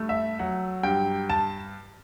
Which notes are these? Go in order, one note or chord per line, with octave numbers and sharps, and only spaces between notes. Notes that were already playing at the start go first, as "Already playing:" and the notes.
Already playing: G2 A3
E5
F#3 F#5
G2 G5
A5